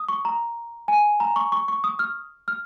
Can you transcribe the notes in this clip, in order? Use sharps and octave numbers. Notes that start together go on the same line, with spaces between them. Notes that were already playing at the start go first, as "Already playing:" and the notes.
Already playing: D#6
C#6
A#5
G#5
A#5
C#6
C#6
C#6
D#6
F6
F6